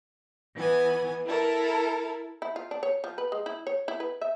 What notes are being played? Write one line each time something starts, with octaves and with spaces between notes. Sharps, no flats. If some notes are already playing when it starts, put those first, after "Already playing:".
E3 B3 G#5
E4 A4 A#4
E4
F4
D4
C#5
F3
B4
G#3
E4
C#5
E4
B4
E5